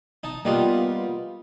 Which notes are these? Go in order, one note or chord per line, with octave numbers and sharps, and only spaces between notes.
D#4 A5
G3 A#3 B3 D#4 F4 G4